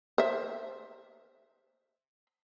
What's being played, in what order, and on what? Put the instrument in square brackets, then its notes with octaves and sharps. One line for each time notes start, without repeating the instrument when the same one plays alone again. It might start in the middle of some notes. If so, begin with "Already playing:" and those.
[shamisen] C5 E5